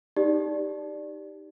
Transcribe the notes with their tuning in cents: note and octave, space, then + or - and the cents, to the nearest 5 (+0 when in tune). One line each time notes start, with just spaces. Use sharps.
D#4 +0 G4 +0 D5 +0